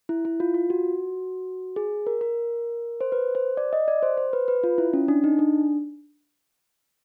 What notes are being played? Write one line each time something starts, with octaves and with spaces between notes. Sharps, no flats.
E4
E4
F4
F4
F#4
G#4
A#4
A#4
C5
B4
C5
D5
D#5
D5
C5
C5
B4
B4
F4
E4
C#4
D4
D#4
D4